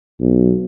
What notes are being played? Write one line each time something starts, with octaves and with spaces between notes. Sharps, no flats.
B1